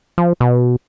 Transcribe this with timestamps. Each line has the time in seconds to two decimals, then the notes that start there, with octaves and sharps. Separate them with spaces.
0.18 F3
0.40 B2